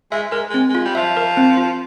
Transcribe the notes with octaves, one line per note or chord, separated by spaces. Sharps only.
G#3 E5
G#3 A#4
G#3
C4
G#3
F4
G3
F3 E5
A#4
C4
F4